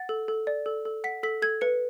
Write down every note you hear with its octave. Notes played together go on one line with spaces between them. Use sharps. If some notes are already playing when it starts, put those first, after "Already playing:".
Already playing: F#5 A6
A4
A4
D5
A4
A4
F#5 B6
A4 B6
A4 G#6
B4 C#7